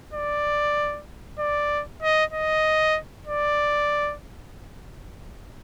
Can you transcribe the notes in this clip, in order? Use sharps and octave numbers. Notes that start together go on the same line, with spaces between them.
D5
D5
D#5
D#5
D5